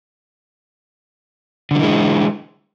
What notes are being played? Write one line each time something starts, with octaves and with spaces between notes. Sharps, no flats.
D3 E3 F#3 G#3